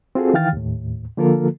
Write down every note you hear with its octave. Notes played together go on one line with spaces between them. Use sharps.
C4 F4 F#4 G#4 A4
D#3 E3 F5 G5 F6 A6
D#2 A2
D3 F3 A#3 F4 A4 A#4